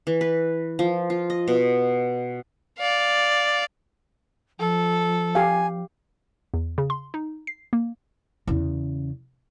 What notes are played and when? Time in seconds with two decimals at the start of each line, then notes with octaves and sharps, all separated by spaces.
0.07 E3
0.21 B4
0.79 F3
1.10 F4
1.30 D#5
1.48 B2
2.78 D5 F5
4.59 F3 A4
5.35 G4 F5 G#5
6.54 E2
6.78 C#3
6.90 C6
7.14 D#4
7.47 C7
7.73 A#3
8.47 E2 C#3